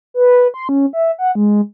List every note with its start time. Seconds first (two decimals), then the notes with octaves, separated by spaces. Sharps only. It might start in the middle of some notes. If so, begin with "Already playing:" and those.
0.14 B4
0.54 C6
0.69 C#4
0.93 E5
1.18 F#5
1.35 G#3